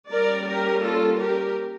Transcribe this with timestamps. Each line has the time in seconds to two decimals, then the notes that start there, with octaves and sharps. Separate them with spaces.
0.10 G3 A#3 C#4 A#4 D5
0.46 G4 A#4
0.82 F4 A4
1.18 G4 A#4